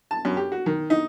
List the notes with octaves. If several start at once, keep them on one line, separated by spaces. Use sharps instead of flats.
A5
F#2
G4
F#4
D#3
D#4